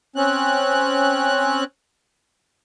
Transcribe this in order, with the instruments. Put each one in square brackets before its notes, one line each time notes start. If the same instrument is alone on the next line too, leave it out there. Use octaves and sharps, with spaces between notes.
[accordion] C4 C#4 F#6